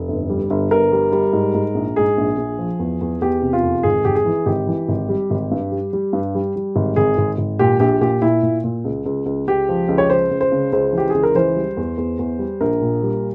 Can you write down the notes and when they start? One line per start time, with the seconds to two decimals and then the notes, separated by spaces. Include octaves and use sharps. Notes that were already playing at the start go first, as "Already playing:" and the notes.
Already playing: F1
0.08 G1
0.29 G3
0.50 G1
0.71 G1 A#4
0.92 G3
1.12 G3
1.33 G#2
1.54 G#2
1.75 A#1
1.96 G#2 G#4
2.18 A#1
2.38 A#1
2.59 F3
2.79 E2
3.01 E2
3.21 E2 G4
3.42 C3
3.53 F4
3.63 F1
3.83 G#1 G#4
4.05 G#1 G4
4.15 G#4
4.25 E3
4.46 G#1 G4
4.67 E3
4.89 G#1
5.09 G3
5.30 G#1
5.51 G2
5.71 G3
5.93 G3
6.13 G2
6.35 G3
6.56 G3
6.76 G#1
6.96 G#1 G#4
7.18 G#1
7.38 G#1
7.59 A#2 G4
7.80 A#1 G4
8.01 A#2 G4
8.22 A#2 E4
8.43 A#2
8.64 A#2
8.84 C#2
9.06 C#2
9.26 C#2
9.48 C#2 G4
9.69 F3
9.88 C#2
9.98 C#5
10.10 C#2 C5
10.31 C#2
10.41 C5
10.52 C#3
10.73 C#2 C5
10.93 E3 G4
11.10 C#2 G#4
11.23 A#4
11.35 E3 C5
11.56 G3
11.77 E2
11.97 E2
12.19 E2
12.39 G3
12.60 A#1 A#4
12.81 A#2
13.03 G3